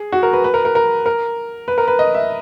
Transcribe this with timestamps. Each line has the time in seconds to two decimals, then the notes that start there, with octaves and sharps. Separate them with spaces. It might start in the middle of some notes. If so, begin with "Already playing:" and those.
Already playing: G#4
0.12 F#4
0.23 A#4
0.33 B4
0.44 B4
0.54 A#4
0.65 A#4
0.75 A#4
1.06 A#4
1.68 B4
1.78 A#4
1.88 B4
1.99 D#5
2.14 E5